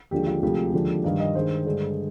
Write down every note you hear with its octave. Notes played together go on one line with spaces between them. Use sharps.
D#2 D3 F3 G#3 G4
F4
D2 C3 F3 G#3 G4
D#2 D3 F3 G#3
G2 D#3 G3 F5
D#5
G2 D#3 G#3 C5
G2 D3 G#3